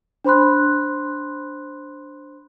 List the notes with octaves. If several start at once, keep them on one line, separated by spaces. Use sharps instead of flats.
D4 C5 B5 C6 F#6